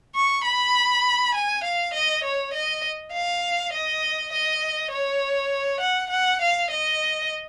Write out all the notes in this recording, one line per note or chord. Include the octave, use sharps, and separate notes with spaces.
C#6
B5
G#5
F5
D#5
C#5
D#5
F5
D#5
D#5
C#5
F#5
F#5
F5
D#5